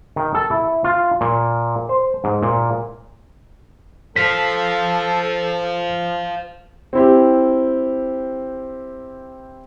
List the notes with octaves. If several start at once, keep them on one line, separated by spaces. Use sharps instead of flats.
D#3
A4
E4
F4
A#2
C5
G#2
A#2
A4 C5 F5 B6
C4 E4 G4